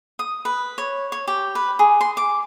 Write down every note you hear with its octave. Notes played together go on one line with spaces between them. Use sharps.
D#6
B4
C#5
C#5
G4
B4
G#4
C6
D6